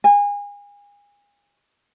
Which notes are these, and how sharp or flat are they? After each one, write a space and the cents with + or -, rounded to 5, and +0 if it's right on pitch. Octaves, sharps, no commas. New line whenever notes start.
G#5 -30